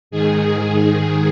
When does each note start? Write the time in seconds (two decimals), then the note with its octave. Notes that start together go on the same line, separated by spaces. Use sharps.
0.11 G#2 D#3 G#4